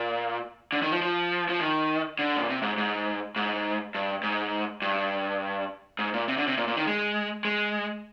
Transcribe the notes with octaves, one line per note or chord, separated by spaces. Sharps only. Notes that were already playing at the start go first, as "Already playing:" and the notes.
Already playing: A#2
D3
D#3
F3
F3
F3
D#3
D3
A#2
C3
G#2
G#2
G#2
G2
G#2
G2
G#2
A#2
C3
D3
C3
A#2
A#2
D#3
G#3
G#3